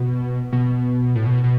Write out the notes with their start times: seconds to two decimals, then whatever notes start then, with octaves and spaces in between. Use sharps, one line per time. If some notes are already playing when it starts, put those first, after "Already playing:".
Already playing: B2
0.53 B2
1.15 A2
1.25 B2
1.44 B2